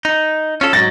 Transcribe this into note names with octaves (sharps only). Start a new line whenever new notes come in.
D#4
C#4 F4 A4
G#2 F#3 A6 A#6